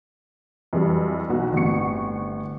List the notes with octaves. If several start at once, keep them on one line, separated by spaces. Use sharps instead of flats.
F2 E3 F#3 G3
B1 F#4
G1 A2 C4 F#5 C#6 C#7